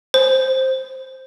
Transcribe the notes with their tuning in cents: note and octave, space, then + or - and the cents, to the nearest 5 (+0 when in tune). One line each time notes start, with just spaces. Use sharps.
C5 +5